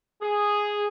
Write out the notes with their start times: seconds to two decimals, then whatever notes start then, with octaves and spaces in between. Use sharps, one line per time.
0.22 G#4